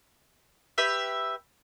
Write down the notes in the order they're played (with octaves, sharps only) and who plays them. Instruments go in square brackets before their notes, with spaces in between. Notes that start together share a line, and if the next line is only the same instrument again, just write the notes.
[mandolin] G4 B4 E5